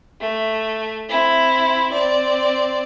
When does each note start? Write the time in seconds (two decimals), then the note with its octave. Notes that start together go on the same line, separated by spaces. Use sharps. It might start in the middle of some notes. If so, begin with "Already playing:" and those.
0.20 A3
1.09 C4 E4
1.92 C4 D5